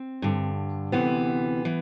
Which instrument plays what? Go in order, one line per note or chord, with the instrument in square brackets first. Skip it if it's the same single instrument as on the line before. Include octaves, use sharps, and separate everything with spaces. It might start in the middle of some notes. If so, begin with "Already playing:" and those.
Already playing: [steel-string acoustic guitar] C4
G2 D3
D2 C3 E3 B3
E3